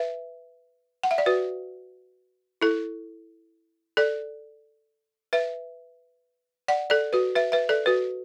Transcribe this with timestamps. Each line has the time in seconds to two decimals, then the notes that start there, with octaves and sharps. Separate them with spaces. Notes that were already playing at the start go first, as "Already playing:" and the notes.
Already playing: B4 E5
1.03 F#5
1.11 E5
1.18 D5
1.26 F#4 B4
2.61 E4 A4
3.97 A4 D5
5.33 B4 E5
6.68 D5 F#5
6.90 A4 D5
7.13 F#4 B4
7.35 B4 E5
7.52 B4 E5
7.69 A4 D5
7.86 F#4 B4